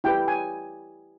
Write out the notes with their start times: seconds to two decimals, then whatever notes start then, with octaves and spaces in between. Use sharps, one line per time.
0.04 E4 G4 B4 G5
0.28 G#5